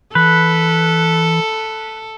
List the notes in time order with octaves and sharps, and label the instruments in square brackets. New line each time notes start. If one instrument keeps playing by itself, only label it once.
[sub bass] E3 [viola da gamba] A4 [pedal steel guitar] B4